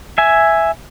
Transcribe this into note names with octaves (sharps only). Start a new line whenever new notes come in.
E5 G#5